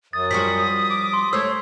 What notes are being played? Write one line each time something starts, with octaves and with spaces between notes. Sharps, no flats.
F#2 D#6 A6
F3 G3 F#4 B6
D6
C6
A3 C5 C#5 E6